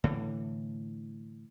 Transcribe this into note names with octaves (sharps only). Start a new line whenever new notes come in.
A2 D3 E3